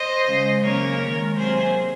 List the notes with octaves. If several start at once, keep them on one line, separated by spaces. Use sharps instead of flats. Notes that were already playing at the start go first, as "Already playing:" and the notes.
Already playing: C5 D#5
C#3 G#3
C#3 F#3 A#3 A#4 C#5
D#3 G#3
C3 F#3 A#3 G#4 C5